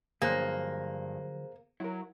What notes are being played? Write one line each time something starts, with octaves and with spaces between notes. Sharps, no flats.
G2 D3 F3 F#3 A#3 G#4 C5 F#6
F#3 E4 A#4